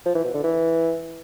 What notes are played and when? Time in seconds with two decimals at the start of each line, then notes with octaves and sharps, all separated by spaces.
0.05 F3
0.15 E3
0.24 B2
0.34 D3
0.44 E3